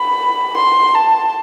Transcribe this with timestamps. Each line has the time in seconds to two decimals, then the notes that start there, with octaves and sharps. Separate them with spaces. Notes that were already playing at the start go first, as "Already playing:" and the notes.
Already playing: B5
0.58 C6
0.95 A5